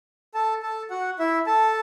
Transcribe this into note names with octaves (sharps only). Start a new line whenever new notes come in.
A4 A5
A4 A5
F#4 F#5
E4 E5
A4 A5